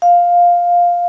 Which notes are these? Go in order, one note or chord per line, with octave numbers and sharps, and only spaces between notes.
F5